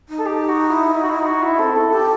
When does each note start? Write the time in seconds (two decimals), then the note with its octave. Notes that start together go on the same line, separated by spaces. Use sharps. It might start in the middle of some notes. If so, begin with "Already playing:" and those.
0.09 D#4
0.19 A4
0.26 G4
0.48 F#4
0.70 E4
0.92 E4
1.02 F#4
1.09 E4
1.20 E4
1.25 F#4
1.43 E4
1.59 C4 A4
1.76 E4 A4
1.93 G4 A4